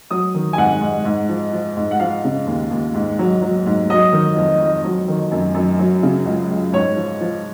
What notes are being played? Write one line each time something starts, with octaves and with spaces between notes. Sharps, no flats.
F#3 D#6
D#3
G#5
G#2 F#5
G#2
G#2
F3
F3
G#2
F#5
F3 F5
C#3
D#2
D#2
G#2
F#3
F#3
G#2
F#3 D#5
D#3
F2
F2
F#3
D#3
F#2
F#2
F#3
C#3
C#2
C#2
G#2 C#5
F3
F3